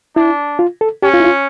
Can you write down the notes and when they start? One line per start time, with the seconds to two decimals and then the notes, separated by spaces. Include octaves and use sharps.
0.16 D4 E4
0.59 F4
0.81 A4
1.02 C#4 G4
1.14 F4
1.20 E4
1.24 F4